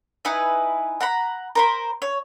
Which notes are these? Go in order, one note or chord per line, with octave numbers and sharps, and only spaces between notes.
D#4 E4 B4 G#5
F#5 A#5 B5
A#4 C5 B5
C#5